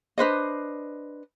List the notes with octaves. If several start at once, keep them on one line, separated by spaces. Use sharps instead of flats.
D4 B4 C5 D#5